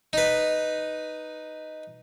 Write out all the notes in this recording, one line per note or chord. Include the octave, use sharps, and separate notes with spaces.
D#4 B4